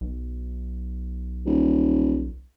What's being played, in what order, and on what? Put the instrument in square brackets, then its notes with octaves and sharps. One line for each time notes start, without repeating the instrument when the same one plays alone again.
[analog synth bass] B1
[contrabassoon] D#1